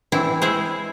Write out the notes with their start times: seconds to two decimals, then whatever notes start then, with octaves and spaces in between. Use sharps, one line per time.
0.12 E3 C4 D4 E4
0.42 G#3 E4 G#4 C5